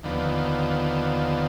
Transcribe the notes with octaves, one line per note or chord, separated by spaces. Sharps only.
D#2 D3 F3 B3